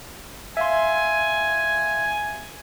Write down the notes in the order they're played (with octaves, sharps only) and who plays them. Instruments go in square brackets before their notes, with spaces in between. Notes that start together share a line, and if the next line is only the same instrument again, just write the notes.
[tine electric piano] E5 F5 C6 [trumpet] G#5